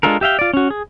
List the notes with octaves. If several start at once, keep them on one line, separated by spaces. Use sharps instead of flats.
G#3 D4 F4 A4 A#4
G4 E5 F5 G5
F4 D5
C#4 F#4
G#4